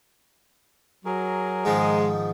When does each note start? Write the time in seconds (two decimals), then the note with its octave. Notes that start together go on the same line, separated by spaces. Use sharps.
1.05 F#3 G#4 A#4
1.65 G#2 D#3 F3 G#3